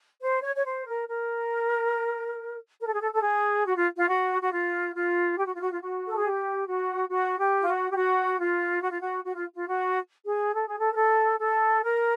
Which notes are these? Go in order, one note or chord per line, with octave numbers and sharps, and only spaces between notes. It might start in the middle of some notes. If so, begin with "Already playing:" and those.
C5
C#5
C#5
C5
A#4
A#4
A#4
A4
G#4
A4
A4
G#4
F#4
F4
F4
F#4
F#4
F4
F4
G4
F#4
F4
F#4
F4
F#4
A4
G#4
G4
F#4
F#4
G4
F4
F#4
G4
F#4
F4
F#4
F4
F#4
F#4
F4
F4
F#4
G#4
A4
G#4
A4
A#4
A4
A4
A#4